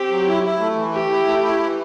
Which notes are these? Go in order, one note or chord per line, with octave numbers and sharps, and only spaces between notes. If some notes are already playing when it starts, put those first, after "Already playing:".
Already playing: C4 G4
F#3
E4
E4
A3
E3
A3 G4
E4
A3
E4
E3